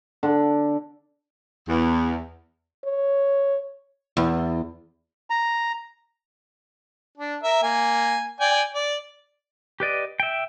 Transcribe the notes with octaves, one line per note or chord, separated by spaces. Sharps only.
D3
E2
C#5
E2
A#5
D4
A#4 E5
A#3 G#5
D5 G5 G#5
D5
G4 B4 D5 D#5
E5 G5